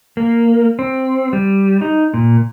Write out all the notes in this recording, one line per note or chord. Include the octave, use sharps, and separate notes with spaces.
A#3
C4
G3
D#4
A#2